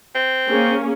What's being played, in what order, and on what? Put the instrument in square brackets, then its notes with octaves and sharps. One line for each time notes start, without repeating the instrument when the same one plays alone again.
[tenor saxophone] C4
[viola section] A#3 C#4 G#4